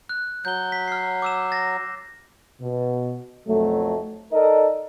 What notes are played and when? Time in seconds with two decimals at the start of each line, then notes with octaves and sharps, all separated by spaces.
0.09 F#6
0.45 F#3 G6 G7
0.72 B6
0.88 F6 C7
1.22 D6 E6 E7
1.52 A6 A#6
2.61 B2
3.48 B1 F2 F#3 A3
4.32 D#4 A4 A#4 D5 D#5